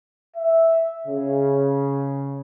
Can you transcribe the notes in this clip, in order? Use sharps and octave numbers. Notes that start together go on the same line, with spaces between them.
E5
C#3